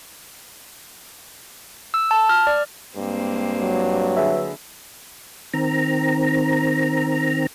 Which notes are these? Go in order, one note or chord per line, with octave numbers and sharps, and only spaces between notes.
E6
A5
F6
D5
G2 G#3 A#3 C4
F#3
D3 G#4 B4 E5
D#3 C4 A#5